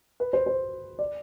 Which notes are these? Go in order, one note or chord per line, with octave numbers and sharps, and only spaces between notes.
B4
C5
C5
D5